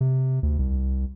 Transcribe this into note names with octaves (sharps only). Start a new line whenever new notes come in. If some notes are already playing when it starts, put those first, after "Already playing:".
C3
D2
C2